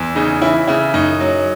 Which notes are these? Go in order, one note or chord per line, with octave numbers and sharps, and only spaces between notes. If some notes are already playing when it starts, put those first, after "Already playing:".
Already playing: E2
C#3 D#4
E3 E4
C#3 E4
F#2 D#4
F#3